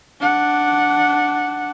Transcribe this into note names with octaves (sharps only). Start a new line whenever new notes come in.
D4 F#5